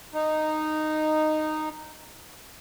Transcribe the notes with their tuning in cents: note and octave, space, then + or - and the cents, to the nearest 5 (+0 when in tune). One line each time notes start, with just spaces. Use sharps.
D#4 -10